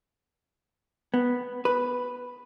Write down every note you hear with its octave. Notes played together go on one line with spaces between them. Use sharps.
B3
B4